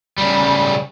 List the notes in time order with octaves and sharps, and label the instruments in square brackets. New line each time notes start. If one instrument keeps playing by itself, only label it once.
[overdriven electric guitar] C#3 G3